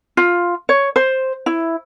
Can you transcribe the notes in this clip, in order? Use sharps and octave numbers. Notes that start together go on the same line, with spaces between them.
F4
C#5
C5
E4